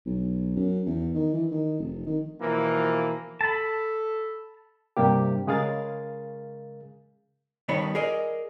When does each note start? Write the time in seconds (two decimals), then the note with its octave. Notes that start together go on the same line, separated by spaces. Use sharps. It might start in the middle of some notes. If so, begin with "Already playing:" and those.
0.06 B1
0.56 F#2
0.86 E2
1.15 D#3
1.34 E3
1.52 D#3
1.80 F1
2.07 D#3
2.41 B2 E3 F3 A#3
3.41 A4 A5 B5
4.97 G2 C3 G3 A#3 G4
5.47 C#3 G#3 G#4 A#4 F5 A6
7.69 G2 D#3 G3 B3 C#5 B5
7.95 G#4 A#4 D5 D#5